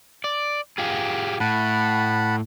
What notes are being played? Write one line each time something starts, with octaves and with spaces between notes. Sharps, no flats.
D5
F4 G4 G#4
A2 F#5 A5 B5